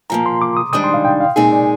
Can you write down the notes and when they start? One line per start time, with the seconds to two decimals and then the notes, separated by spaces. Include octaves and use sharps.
0.10 A#2 F3 A#3 A#5
0.26 C6
0.41 D6
0.57 D#6
0.73 G#2 D#3 G3 D4 D#6
0.84 C6
0.94 F5
1.05 G5
1.20 F5
1.36 A#2 G#3 C4 D#4 G#4
1.52 D5